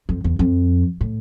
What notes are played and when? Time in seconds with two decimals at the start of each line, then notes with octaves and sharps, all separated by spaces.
0.09 F2
0.24 E2
0.39 F2
1.01 A2